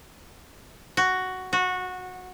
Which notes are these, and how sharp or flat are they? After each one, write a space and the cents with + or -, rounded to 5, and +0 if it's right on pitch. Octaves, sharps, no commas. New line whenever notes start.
F#4 +5
F#4 -15